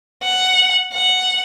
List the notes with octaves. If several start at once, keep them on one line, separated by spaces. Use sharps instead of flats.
F#5
F#5